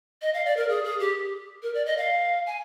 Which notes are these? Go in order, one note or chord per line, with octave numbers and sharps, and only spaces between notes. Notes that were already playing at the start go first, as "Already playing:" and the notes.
D#5
F5
D5
A#4
G#4
G#4
G4
A#4
D5
D#5
F5
G#5